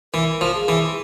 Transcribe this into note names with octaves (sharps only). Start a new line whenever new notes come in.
E3 A#4
F3
G#4
E3